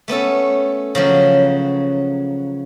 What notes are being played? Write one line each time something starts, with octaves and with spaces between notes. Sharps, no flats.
A3 B3 C#4 A4
C#3 F3 F#3